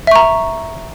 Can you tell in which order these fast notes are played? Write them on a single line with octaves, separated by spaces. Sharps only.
E5 C#6 A#5